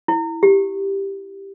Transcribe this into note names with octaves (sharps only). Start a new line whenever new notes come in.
E4
G4